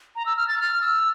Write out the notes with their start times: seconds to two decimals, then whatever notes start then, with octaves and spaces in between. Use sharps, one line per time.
0.16 A#5
0.26 E6
0.37 F6
0.48 A6
0.59 F6
0.81 E6